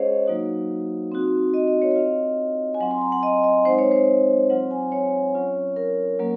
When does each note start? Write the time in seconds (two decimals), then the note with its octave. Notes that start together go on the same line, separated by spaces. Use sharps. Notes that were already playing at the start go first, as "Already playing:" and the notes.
Already playing: G#3 C#4 F4 G#4 C5 C#5 D#5 F5
0.27 F#3 A#3 D#4 F#4
1.12 C4 D#4 F#4
1.54 D#5
1.68 D#5
1.82 C#5
1.92 D#5
1.96 C4 F4 F5
2.74 G#5
2.80 F#3 C4 F4 F#5
2.91 C6
3.02 A#5
3.12 F#5
3.23 D#5
3.44 D#5
3.65 G#3 C4 D#4 C5
3.78 C#5
3.92 C5
4.50 F#3 C4 F4 F#5
4.71 G#5
4.92 C#5
5.35 F#3 C#4 F4
5.76 A#4
6.19 F#3 A#3 C#4